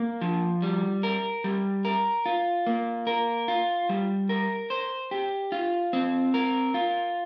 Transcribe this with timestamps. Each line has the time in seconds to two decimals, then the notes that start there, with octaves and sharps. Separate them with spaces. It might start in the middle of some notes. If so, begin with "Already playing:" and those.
Already playing: A#3
0.21 F3
0.62 G3
1.03 A#4
1.44 G3
1.85 A#4
2.26 F4
2.67 A#3
3.07 A#4
3.48 F4
3.89 G3
4.29 A#4
4.70 C5
5.11 G4
5.52 F4
5.93 C4
6.34 A#4
6.74 F4